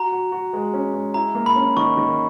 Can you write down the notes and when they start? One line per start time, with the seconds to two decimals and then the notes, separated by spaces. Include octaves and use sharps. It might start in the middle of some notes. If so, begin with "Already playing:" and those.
Already playing: F#4 A#5
0.12 F#4
0.32 F#4
0.53 G#3
0.73 C#4
0.94 G#3
1.14 E4 A#5
1.35 A#3
1.46 B5
1.56 C#4
1.77 D#3 C#6
1.97 D#3